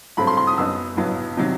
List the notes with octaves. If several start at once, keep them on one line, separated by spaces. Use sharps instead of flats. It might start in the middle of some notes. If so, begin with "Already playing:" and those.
G2 F#3 A3 C4 B5
C6
C6
D#6
F#2 F#3 B3 D#4 E6
A1 G2 F#3 B3
C3 D#3 F#3